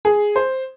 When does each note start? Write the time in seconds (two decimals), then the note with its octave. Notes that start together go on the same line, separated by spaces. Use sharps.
0.05 G#4
0.36 C5